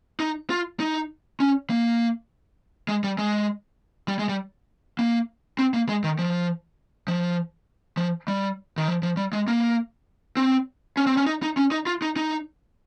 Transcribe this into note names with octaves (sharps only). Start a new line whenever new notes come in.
D#4
F4
D#4
C#4
A#3
G#3
G3
G#3
G3
G#3
G3
A#3
C4
A#3
G#3
D#3
F3
F3
F3
G3
D#3
F3
F3
G3
G#3
A#3
C4
C#4
C4
C#4
D#4
D#4
C#4
D#4
F4
D#4
D#4